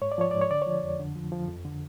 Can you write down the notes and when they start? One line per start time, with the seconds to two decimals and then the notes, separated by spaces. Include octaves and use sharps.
0.02 G#2 C#5
0.12 D5
0.18 F3 C#5
0.31 G#2 D5
0.41 C#5
0.50 D3 D5
0.62 F3 C#5
0.83 F2
0.99 D3
1.16 F3
1.32 F3
1.48 F2
1.65 D3